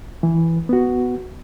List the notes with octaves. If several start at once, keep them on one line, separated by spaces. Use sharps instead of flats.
E3
B3 F#4